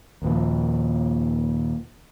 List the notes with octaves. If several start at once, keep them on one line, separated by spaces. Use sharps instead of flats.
D#2 A#2 F3